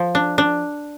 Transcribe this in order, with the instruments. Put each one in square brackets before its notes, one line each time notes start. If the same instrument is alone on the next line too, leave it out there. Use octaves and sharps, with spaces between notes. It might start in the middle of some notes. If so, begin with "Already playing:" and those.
Already playing: [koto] F3
D4
D4